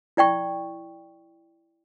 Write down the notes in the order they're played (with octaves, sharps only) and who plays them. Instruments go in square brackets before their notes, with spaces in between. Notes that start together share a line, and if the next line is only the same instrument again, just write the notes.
[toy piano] E4 D5 G5 C#6